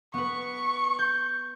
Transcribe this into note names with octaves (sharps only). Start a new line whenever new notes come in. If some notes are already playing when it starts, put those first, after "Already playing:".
B3 B4 C#6
G6